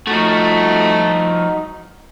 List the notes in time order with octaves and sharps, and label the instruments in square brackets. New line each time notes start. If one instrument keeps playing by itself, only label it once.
[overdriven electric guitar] F3 F#4 [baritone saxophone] A3 [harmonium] D#4